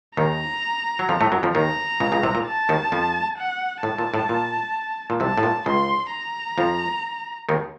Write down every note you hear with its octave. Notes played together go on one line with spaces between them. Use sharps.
D#2 D#3 A#5
F#3
F2 F3
A2 A3
F#2 F#3
F2 F3
D#2 D#3 A#5
C#2 C#3
C#2 C#3
C2 C3
A#2
A5
D#2 D#3
F2 F3
F#5
A2 A5
A#2
A2
A#2
A#2
C2 C3 A5
A2
A#2
C#2 C#3 C6
A#5
F2 F3
D#2 D#3